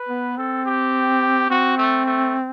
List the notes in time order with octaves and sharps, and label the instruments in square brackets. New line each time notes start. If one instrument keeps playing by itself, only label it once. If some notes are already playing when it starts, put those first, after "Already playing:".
Already playing: [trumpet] B4
[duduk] B3
[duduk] C4 [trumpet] A4
[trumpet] G4
[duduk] C4 [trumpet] F#4
[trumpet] A3
A3